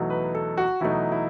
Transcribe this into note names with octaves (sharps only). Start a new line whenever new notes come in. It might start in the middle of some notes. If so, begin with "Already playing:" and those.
Already playing: E2 B2 F#3 A3 D#4
B4
A4
F#4
E2 B2 F#3 A3 D#4 E4
E4